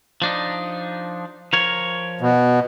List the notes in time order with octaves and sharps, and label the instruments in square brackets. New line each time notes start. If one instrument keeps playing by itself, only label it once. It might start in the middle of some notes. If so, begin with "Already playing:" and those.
[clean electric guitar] F3 D4 D#4
F3 A#4 C#5
[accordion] B2